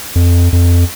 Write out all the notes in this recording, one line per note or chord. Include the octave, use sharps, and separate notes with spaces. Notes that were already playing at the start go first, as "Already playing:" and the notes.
F2
F2